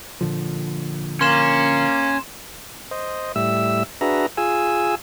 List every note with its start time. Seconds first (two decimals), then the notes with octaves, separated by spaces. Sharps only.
0.21 A#2 D3 F3
1.21 A#3 C#4 C6 E7
2.91 C5 D#5
3.36 A2 G3 E5 E6
4.01 D4 F#4 G#4 B4 E5 A#5
4.37 F4 G#4 G#5 E6